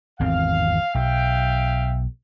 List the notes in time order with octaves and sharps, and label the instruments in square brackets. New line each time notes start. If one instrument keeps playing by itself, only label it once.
[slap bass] G#1 E2 C4 [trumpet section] F5
[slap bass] B1 [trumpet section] E5 F5 G5